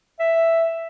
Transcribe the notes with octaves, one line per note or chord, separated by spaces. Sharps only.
E5